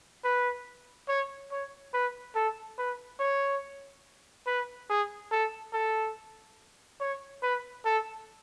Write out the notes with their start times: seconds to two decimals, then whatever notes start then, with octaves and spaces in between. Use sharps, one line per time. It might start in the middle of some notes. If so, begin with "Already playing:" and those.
0.24 B4
1.08 C#5
1.51 C#5
1.94 B4
2.35 A4
2.78 B4
3.20 C#5
4.47 B4
4.89 G#4
5.32 A4
5.73 A4
7.00 C#5
7.42 B4
7.85 A4